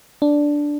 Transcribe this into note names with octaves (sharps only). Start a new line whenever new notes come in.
D4